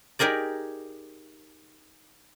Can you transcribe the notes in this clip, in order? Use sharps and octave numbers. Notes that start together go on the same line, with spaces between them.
D#4 G4 G#4 A#4 D5